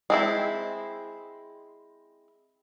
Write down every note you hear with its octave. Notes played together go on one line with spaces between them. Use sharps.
G#3 C4 E4